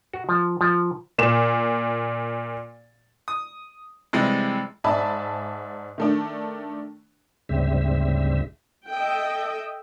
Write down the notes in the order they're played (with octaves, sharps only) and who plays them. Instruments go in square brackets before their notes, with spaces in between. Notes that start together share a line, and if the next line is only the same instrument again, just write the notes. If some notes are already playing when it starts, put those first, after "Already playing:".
[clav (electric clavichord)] F#4
F3
F3
[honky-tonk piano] A#2 E7
[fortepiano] D#6
C3 E3 G3 G#3
[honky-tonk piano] G#2 D5 E5 G#5 A5 B5
D#3 A3 D4
[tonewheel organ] D2 G#2 C#3 G3 C4 E5
[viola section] A4 D#5 E5 G5